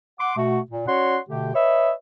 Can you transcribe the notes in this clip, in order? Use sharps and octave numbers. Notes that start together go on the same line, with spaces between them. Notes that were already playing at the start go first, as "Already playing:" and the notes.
F#5 C6 D6
B2 A3 F#4
A#2
C#4 F#4 C#5 D5 F#5 C6
B2 D3 A3 G4
B4 C#5 D#5 E5